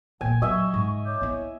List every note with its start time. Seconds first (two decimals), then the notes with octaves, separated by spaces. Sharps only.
0.21 A#2 D3 G5 G#5
0.42 F#3 D#5 E5 F#5 G#5 C#6
0.74 G#2 C#3
1.05 C#5 D6 G6
1.21 B3 E4 C#5